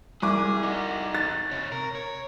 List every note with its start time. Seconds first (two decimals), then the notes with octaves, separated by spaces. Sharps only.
0.22 C2 G#4 D6
0.63 D#4 F#4
1.15 A6
1.51 C3 C#5
1.72 A#4
1.95 C#5